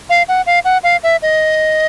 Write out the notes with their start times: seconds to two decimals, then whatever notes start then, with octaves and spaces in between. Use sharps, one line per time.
0.10 F5
0.28 F#5
0.46 F5
0.65 F#5
0.83 F5
1.03 E5
1.22 D#5